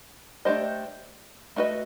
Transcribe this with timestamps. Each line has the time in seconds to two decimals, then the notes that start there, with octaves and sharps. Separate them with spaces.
0.45 A3 D4 G4 C5 D#5
1.56 A3 D4 F#4 B4 D#5